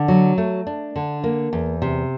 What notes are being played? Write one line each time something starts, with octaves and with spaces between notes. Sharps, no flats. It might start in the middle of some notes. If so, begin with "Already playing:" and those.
Already playing: D3
F#3
A3
D4
D3
A#3
E2
C3